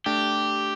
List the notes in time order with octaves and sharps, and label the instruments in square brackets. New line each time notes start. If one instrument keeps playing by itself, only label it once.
[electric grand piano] A3 D4 [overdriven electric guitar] G4